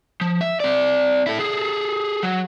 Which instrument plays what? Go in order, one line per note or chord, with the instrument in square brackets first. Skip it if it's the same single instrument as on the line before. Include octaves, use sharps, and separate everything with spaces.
[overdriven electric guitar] F3
E5
C4 D5
E4 A4
G#4 A4
F#3